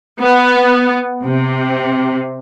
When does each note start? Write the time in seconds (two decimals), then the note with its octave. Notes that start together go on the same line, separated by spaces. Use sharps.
0.21 B3
1.24 C3